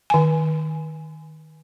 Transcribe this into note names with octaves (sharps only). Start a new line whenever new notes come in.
D#3 G#5